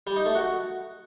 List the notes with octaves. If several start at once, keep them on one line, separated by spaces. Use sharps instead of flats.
G3
D#4
A3
F#4